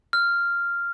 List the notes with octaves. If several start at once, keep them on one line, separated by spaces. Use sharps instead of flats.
F6